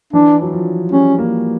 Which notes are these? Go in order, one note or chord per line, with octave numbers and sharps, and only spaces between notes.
E3 D4
F#3
F3
G3 C#4
A#3